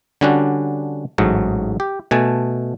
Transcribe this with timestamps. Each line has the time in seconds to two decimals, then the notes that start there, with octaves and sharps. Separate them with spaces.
0.21 D3 G3 C#4 D4 F#4
1.18 A1 G#2 F#3 A3
1.80 G4
2.11 B2 A3 G#5 A5